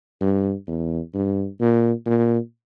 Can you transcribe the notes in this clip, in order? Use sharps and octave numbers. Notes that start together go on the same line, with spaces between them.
G2
E2
G2
A#2
A#2